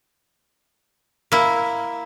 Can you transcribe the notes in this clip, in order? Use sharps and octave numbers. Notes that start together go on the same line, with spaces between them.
A#3 E4